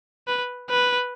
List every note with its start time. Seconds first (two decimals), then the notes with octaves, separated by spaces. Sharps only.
0.28 B4
0.70 B4